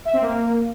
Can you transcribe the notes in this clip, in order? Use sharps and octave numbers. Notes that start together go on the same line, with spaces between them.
E5
C4
A#3